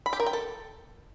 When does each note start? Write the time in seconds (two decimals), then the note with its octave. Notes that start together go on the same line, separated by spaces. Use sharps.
0.06 B5
0.13 G4
0.20 A#4
0.26 G5
0.33 A4